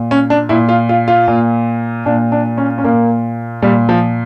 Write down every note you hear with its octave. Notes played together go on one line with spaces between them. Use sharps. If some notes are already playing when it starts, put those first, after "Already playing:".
Already playing: A#2
C#4
D4
A#2 E4
F4
F4
F4
A#2
A#2 D4
D4
C#4
C#4
A#2 A#3
A#2 G3
F3